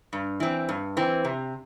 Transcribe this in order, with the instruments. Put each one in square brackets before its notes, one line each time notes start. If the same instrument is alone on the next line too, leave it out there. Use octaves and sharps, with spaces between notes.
[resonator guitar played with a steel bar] G2
E3 C4
G2
E3 C4
C3